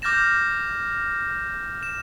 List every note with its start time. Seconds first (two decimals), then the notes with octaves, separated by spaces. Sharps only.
0.02 D6 F6 G6 A6 A#6 E7
1.83 E7